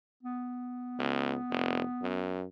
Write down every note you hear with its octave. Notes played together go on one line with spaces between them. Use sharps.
B3
C#2
F1
F#2